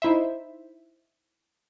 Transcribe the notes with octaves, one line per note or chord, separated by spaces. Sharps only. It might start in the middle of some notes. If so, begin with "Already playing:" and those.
D#4 E4 C5 E5